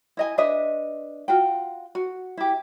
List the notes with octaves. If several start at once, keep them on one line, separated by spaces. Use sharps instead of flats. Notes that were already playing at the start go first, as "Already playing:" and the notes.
E4 D#5 G#5
D4 B4 D#5 E5
F4 F#4 G5
F#4
E4 G4